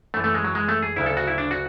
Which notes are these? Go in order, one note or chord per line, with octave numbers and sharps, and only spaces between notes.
F#2 E3 A3
A3
G#3
F#3
G#3
A3
G#4
D2 C#3 F#3 E4
A4
F#4
E4
D4
F#4